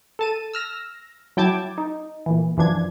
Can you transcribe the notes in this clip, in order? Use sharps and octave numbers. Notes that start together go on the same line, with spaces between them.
A4 A5 D#7
E6 F6 A#6
F#3 E4 G5 A5 D6 G#6
D#4
A#2 E3
F#2 E3 F3 D4 G#6